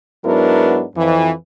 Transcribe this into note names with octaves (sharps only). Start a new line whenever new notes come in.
G#2 F#3 B3 D4 E4 A#4
F2 E3